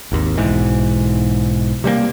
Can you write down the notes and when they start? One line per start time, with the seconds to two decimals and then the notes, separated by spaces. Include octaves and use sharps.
0.12 G#1 D#2
0.38 B1 G#2 E3
1.84 C3 G3 G#3 A#3